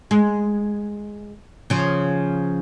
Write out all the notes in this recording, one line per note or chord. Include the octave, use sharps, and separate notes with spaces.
G#3
C#3 F3